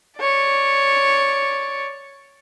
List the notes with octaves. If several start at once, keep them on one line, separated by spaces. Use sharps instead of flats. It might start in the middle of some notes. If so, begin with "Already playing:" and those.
C#5 D5